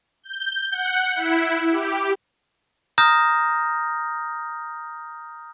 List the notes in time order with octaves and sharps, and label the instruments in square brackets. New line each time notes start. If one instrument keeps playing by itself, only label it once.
[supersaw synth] G6
F#5
E4
G4
[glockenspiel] A#5 D#6 F6 G6 A#6